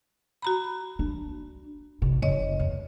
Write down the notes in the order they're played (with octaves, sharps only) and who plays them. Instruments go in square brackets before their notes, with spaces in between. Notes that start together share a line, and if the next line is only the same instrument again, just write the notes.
[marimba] F#4 A#5 B5
[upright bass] D4
A1 C3
[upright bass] F#1 [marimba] C#5 D#5
[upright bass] E2